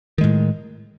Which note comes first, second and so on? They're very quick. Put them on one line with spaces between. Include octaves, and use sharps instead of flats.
D#3 G#3 A2